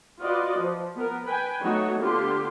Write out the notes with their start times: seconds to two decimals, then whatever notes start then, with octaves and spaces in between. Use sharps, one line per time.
0.19 F4 F#4 B4 D5 D#5
0.59 F3
0.96 B3 A#4
1.26 B4 G5 G#5
1.61 F#3 A3 B3 D#4 F#4 C#5
1.99 D3 B3 F4 G4 C6